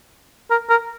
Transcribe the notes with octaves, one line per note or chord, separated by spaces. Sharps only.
A#4
A#4